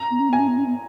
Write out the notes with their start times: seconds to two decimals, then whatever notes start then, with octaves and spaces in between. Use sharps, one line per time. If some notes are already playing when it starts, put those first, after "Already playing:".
Already playing: A#5
0.10 B3
0.20 C#4
0.29 B3 G#5
0.39 C#4
0.48 B3
0.58 C#4
0.66 B3